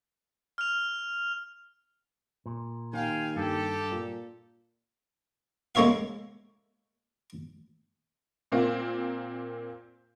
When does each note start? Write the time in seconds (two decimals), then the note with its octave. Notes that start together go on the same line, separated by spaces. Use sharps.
0.58 F6 F7
2.46 A#2
2.93 D#2 F5 G5 G#5
3.36 G2 G4 A4
3.92 A#2
5.75 G#3 A#3 C#4 C#5 E5 F5
8.52 A#2 A#3 C4